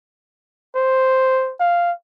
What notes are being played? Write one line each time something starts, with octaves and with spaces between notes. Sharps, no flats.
C5
F5